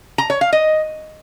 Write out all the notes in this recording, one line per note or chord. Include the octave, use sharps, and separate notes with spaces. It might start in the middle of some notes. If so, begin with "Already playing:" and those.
A#5
C#5
F5
D#5